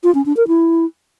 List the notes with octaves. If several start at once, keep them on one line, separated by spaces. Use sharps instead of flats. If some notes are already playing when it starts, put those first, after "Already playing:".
F4
C#4
D4
A#4
E4